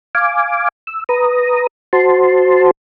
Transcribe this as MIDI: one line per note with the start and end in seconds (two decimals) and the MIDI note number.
0.15 0.68 77
0.15 0.68 80
0.15 0.68 86
0.87 1.04 88
1.09 1.67 71
1.09 1.67 82
1.09 1.67 87
1.93 2.71 66
1.93 2.71 72
1.93 2.71 81
1.93 2.71 84